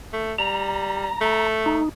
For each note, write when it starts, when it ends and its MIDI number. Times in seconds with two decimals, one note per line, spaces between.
0.13 0.34 57
0.39 1.09 55
0.39 1.47 82
1.21 1.80 57
1.66 1.89 63